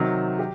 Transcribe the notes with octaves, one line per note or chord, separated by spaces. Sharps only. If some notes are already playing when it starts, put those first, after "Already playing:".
Already playing: C3 D#3 F#3
G4